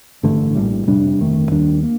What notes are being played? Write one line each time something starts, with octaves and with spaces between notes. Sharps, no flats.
A1 G2 D3 A3
A#1 A2 G3
F2 C3 G3 D4
G1 F2 D#3 A3
D#2 D#3 G3 D4
A#3